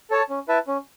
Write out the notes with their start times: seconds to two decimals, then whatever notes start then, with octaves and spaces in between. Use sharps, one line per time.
0.10 A4 C#5 A5
0.29 C#4
0.48 E4 B4 E5 A5
0.67 C#4